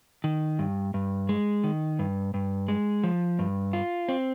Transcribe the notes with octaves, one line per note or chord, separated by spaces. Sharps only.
D#3
G2
G2
G#3
D#3
G2
G2
G#3
F3
G2
F4
C4